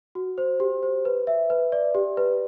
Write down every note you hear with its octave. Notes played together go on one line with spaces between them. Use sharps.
F#4
C5
G4
C5
B4
E5
B4
D5
G4
B4